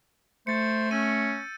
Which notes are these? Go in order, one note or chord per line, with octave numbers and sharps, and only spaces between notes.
A3 C5 G6 A6 C#7
C#4 E6 D#7